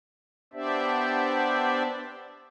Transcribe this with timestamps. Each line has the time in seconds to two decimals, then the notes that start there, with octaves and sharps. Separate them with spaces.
0.53 B3 D4 G4 C5 D5 E5